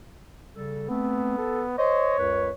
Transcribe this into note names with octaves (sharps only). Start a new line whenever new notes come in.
C#3 G3 A4
A3 B3 C4
A4
C5 C#5 D#5
C#2 F#2 B4